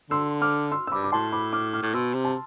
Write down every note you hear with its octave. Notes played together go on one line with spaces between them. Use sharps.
D3 C6 E6
D6 F6
C6 E6
E6
G2 B5 D6
D6
A2 A5 C6
B5 D6
D6 F6
D6 F6
A2
B2 C6 E6
C3
A5 C6